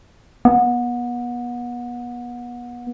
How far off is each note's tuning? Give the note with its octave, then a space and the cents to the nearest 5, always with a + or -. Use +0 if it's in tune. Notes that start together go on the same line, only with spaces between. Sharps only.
B3 -30